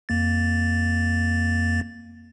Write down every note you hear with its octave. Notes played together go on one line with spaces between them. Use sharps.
F2 A#3 A6